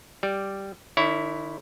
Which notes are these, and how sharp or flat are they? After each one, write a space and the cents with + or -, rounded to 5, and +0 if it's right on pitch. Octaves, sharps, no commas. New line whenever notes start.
G3 +0 D5 +0
D#3 -40 E4 +0 C#5 +25